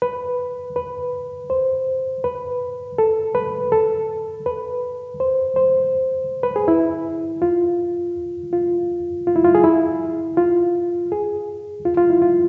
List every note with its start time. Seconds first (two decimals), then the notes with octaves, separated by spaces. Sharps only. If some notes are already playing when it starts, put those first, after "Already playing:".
0.02 B4
0.76 B4
1.50 C5
2.24 B4
2.98 A4
3.35 B4
3.72 A4
4.46 B4
5.20 C5
5.56 C5
6.43 B4
6.56 G#4
6.68 E4
7.42 F4
8.53 F4
9.27 F4
9.36 E4
9.44 F4
9.55 G#4
9.64 E4
10.37 F4
11.12 G#4
11.85 F4
11.97 F4
12.10 E4
12.22 F4